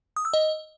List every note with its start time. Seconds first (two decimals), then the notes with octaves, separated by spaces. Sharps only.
0.16 D#6
0.25 E6
0.33 D#5